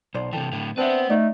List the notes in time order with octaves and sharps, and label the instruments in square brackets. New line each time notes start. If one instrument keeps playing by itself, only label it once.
[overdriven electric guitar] B1 [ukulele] C5 D5
[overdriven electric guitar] C3 E3 [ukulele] A4 G5
[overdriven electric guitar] A2 D3
[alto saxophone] C4 [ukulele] D4 E5 [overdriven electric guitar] B4 F#5
[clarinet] A3 [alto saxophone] D#4 [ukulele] D5